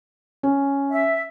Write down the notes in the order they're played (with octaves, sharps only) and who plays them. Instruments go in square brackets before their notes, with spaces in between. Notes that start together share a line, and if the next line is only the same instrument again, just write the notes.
[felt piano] C#4
[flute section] E5